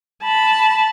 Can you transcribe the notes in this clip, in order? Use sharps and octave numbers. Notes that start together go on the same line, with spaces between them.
A5 B5